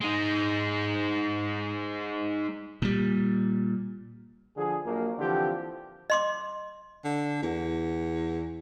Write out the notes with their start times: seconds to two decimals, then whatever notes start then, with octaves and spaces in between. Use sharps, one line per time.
0.01 G#3 D#4
2.82 A#2 G3
4.57 D3 F3 G#4
4.85 A#1 F#3 A#3
5.19 D3 E3 F3 C4 G4
6.10 D#5 C6 D6
7.04 D3
7.42 E2